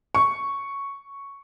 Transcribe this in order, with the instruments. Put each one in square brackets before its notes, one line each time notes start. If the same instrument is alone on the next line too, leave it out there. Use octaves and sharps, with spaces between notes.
[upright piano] C#6